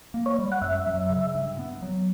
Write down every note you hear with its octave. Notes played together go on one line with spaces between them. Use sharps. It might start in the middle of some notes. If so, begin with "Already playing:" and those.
A#3
C#5
G3
F#5
F#2 E5
F#3
C#3
G2
B3
F#3